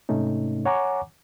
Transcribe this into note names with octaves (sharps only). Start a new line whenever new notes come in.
G#2 C3 A3 C#4 D#4
C#5 F#5 G#5 A#5 C#6 D6